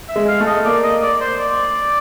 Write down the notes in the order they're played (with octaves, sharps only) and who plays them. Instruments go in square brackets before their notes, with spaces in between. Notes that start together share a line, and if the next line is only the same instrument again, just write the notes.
[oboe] E5
[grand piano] G#3
[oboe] F5
[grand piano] A3
[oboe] D#5
[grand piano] A#3 [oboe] D5
[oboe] D#5
D5
C5
D5